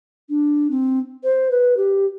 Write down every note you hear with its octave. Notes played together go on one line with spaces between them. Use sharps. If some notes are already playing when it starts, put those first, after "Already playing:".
D4
C4
C5
B4
G4